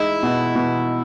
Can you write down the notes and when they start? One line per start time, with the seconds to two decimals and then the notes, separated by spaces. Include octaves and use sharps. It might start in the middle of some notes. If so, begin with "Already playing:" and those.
Already playing: G#3 D#4 E4
0.23 B2
0.55 B2